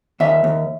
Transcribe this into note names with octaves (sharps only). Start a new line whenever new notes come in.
D#2 E5
D#2